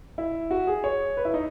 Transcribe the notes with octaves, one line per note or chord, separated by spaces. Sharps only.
E4
F#4
G#4
C#5
B4
E4
D#4